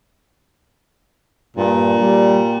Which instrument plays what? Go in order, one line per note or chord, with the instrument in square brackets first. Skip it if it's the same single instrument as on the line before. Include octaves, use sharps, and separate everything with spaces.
[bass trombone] G2 [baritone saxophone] A#2
[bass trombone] G3